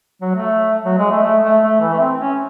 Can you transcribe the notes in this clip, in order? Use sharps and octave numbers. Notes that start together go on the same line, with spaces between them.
F#3
A3
F#3
G#3
A3
A3
A3
A3
E3
A3
C4
C#4